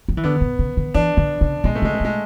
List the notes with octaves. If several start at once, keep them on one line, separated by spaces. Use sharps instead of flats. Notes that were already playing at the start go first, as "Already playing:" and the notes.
F#3
E3
D3 B3
B2
C#3
D3
E3 D4
D3
C#3
B2 G#3
A3
C#3 G#3
A3
B2 G#3